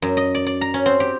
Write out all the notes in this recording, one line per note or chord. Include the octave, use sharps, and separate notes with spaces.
F#2
D#5
D5
D5
A#5
C#4
C4
G4